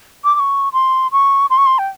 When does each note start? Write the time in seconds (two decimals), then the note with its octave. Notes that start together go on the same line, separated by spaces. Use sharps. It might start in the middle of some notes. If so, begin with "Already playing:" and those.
0.24 D6
0.34 D6
0.39 C#6
0.73 C6
1.12 C#6
1.50 C6
1.58 C#6
1.66 C6
1.78 G5